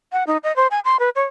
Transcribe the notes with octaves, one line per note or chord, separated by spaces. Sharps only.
F#5
D#4
D#5
C5
G#5
C6
B4
C#5